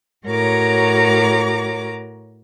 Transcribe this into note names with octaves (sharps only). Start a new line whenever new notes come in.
A2 F#4 A#4 C#5 A#5 D6